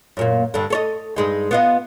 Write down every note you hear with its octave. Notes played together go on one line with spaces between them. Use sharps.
F#2 A#2 A#3
G2 D3
A4 C#5 D#5
G2 G#3 D#4
B3 F4 D#5